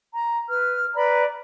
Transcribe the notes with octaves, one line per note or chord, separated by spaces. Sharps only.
A#5
B4 F6
B4 D5 A#5 B5